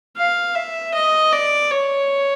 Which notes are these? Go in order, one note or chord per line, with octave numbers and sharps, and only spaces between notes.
F5
E5
D#5
D5
C#5